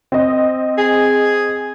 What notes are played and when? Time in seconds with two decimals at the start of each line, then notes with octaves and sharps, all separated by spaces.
0.12 C4 D#5
0.78 G#4